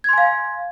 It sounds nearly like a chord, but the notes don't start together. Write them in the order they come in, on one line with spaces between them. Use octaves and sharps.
G#6 C6 G#5 F5